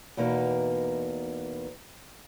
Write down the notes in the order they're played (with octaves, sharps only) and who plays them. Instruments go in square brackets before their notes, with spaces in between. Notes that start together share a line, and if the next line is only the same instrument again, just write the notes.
[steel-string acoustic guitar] E2 B2 E3 A#3 D#4